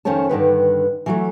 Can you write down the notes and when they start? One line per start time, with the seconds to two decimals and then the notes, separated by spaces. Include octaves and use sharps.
0.05 F2 D#3 C#4 C5 C#5 A5
0.29 G2 D3 D#3 B4
1.06 E3 F#3 A3